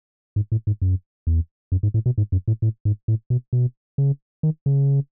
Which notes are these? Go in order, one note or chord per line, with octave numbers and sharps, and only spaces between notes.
G#2
A2
G#2
F#2
E2
F#2
G#2
A2
B2
G#2
F#2
A2
A2
G#2
A2
B2
B2
C#3
D#3
C#3